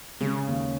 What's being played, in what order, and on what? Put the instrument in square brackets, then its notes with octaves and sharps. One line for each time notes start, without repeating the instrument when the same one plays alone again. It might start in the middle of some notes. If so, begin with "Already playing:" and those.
[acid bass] C#3 [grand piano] G#3
[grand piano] D#2